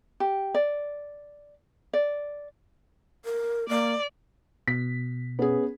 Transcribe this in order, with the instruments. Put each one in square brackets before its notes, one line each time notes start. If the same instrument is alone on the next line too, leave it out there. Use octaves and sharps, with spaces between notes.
[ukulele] G4
D5
D5
[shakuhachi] A#4
[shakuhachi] A#3 [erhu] D5
[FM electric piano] B2 [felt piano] B6
[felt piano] B3 C#4 G#4